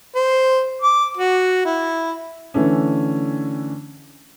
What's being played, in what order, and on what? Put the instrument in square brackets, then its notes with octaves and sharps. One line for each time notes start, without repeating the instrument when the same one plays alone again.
[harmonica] C5
D6
F#4
E4
[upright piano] D3 E3 A3 C#4